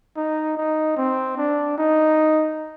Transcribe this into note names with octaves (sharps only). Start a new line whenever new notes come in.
D#4
D#4
C4
D4
D#4